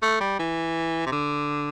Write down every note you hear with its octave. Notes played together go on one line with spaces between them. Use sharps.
A3
G3
E3
C3
D3